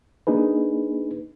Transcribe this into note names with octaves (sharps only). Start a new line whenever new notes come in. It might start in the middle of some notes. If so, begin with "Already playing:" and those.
A#3 D4 D#4 G#4 B4